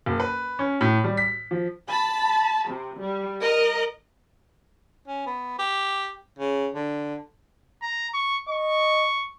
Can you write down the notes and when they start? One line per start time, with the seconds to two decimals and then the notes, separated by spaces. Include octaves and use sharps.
0.06 F#1
0.20 B4
0.59 C#4
0.81 A2
1.04 G3
1.17 B6
1.51 F3
1.88 A5 B5
2.69 C3
3.00 G3
3.41 A#4 D#5
5.07 C#4
5.26 B3
5.59 G4
6.39 C#3
6.74 D3
7.82 A#5
8.14 C#6
8.49 D#5 C#6